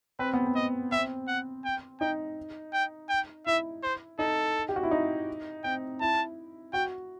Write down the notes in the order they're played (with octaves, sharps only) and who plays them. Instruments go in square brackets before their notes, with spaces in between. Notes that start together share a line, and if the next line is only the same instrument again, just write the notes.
[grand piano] C4 [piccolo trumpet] B4
[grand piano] B3
C4
[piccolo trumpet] D#5
[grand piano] C4 [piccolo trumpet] E5
[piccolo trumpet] F#5
G5
[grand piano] D#4 [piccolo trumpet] G5
[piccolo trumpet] G5
G5
[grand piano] E4 [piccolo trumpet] E5
[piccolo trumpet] C5
[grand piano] D#4 [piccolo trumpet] A4
[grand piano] G4
F#4
E4
D#4
[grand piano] C4 [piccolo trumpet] G5
[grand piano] E4 [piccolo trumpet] A5
[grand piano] F#4 [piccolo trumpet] G5